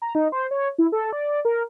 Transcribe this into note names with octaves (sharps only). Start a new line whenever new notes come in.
A#5
D#4
C5
C#5
E4
A4
D5
A#4